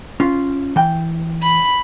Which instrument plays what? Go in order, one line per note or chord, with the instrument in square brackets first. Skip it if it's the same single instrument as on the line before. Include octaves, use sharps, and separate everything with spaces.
[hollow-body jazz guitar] C#4 F4
E3 G5
[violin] B5